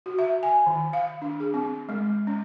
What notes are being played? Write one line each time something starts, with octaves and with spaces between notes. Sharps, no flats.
F#4
E5
G#5
D#3
F5
D4
G#4
C4
G#3
C#4